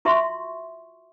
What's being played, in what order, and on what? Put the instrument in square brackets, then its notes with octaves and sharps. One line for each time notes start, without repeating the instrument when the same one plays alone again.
[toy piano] F4 F#4 E5 C6 C#6